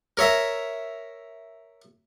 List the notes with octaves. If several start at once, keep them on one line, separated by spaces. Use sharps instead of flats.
A#4 C#5 E5 A#5